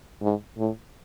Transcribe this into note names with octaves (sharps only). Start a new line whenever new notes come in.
G#2
A2